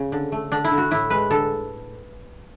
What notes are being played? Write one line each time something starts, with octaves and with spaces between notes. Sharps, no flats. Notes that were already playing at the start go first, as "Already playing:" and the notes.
Already playing: C#3
D3
A3
D3 D4
E4
D3
F#4
A2 E4
G#3 B4
D3 A4